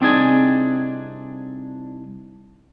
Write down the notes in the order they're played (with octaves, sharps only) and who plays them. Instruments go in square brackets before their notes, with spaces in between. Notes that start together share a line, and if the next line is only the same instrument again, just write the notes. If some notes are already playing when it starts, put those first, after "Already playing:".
[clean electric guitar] C2 C4 D4 D#4 G#4 G#5